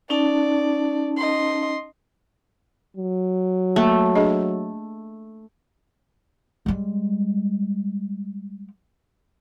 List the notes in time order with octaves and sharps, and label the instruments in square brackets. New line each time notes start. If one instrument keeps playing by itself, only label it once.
[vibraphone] C#4 D#4 A5 [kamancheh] D5
[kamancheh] D#5 C6
[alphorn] F#3
[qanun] A3 [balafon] A#3
[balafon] D4 G#4 D#5
[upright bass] G3 G#3